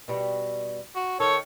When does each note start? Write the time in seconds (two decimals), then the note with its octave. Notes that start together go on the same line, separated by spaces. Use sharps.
0.08 B2 G3
0.95 F#4
1.20 D#3 A4 C#5